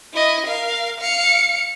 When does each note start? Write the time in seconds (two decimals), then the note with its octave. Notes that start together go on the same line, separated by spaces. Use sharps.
0.13 E4 D#5
0.46 A#4 F5
1.00 F5 C#7